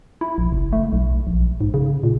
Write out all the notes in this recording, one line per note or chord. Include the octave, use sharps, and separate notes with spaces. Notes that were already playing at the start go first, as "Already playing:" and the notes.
E4
A#1
F#1
A3
B1
A#1
G#2
C#3
A#2